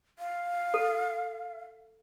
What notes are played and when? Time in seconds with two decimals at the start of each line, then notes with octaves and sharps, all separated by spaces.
0.19 F5
0.74 A4